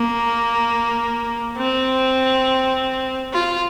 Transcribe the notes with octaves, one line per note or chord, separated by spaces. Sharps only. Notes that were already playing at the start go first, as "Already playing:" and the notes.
Already playing: A#3
C4
F4